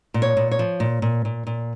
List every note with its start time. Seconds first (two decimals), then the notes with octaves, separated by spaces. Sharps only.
0.14 A#2
0.22 C#5
0.37 A#2
0.51 C#5
0.59 F3
0.80 A#2
1.02 A#2
1.25 A#2
1.47 A#2